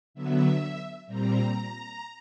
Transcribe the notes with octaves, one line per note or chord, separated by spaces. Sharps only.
D3 F#3 B3 E5
A#2 G3 C4 A#5